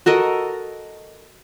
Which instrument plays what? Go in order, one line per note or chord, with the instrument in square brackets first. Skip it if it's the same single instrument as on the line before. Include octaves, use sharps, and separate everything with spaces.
[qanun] F#4 A4 A#4 D#5